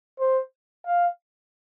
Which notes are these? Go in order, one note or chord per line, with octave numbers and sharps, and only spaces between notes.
C5
F5